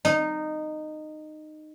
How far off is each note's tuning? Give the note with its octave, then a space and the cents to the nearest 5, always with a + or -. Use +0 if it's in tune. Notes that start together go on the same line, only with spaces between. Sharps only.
D#4 -15